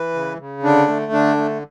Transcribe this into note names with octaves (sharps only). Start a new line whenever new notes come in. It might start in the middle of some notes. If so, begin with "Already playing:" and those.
Already playing: E3 B4
C#3
C#3
D3 D4
A3
D3 D4
A3